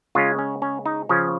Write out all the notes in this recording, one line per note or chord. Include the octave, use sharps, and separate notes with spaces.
C#3 G#3 C#4 F4
C#4
C#4
D#4
C#3 F3 C#4